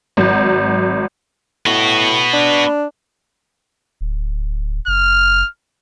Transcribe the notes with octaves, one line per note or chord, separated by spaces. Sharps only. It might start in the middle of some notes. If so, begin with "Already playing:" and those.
G#1 F#3
A2 B3 F#4
D4
D1
F#1 F6